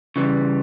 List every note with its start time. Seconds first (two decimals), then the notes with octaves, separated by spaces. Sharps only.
0.16 C#3 E3 G3